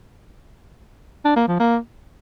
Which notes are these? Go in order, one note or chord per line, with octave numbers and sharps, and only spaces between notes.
D4
A#3
F3
A#3